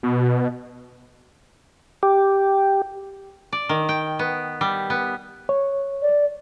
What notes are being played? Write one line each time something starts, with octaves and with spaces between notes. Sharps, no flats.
B2
G4
D5
D#3
G5
B3
G3
B3
C#5
D5